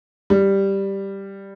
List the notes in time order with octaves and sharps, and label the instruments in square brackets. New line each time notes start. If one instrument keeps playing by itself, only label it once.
[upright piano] G3